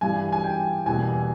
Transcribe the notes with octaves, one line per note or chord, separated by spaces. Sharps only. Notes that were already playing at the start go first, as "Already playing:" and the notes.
G2 E3 G3 G#5
G#5
G5
E2 B2 G3 A#3 G#5